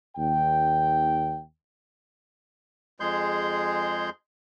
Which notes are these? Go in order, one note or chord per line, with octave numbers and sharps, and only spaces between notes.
D#2 G5
F2 G#3 G#4 C6 G6